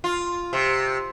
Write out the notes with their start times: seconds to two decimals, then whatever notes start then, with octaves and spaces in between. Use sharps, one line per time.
0.04 F4
0.53 C3